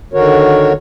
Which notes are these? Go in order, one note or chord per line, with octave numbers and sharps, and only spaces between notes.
D3 D#3 F#4 A#4 C#5